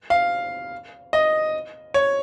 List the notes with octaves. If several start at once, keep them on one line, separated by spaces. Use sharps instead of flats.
F5
D#5
C#5